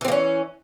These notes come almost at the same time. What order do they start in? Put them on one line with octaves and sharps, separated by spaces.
E3 C4 A#3 C#4